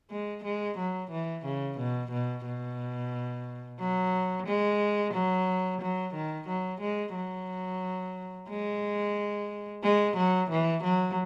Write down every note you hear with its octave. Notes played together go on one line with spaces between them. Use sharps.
G#3
G#3
F#3
E3
C#3
B2
B2
B2
F#3
G#3
F#3
F#3
D#3
F#3
G#3
F#3
G#3
G#3
F#3
E3
F#3